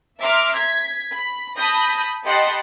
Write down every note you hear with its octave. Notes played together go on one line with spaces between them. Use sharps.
E5 A#5 C6 D6 F6
G#6 B6
B5
A5 B5 D#6 G6 A#6
G4 D#5 F#5 A5 B5 C6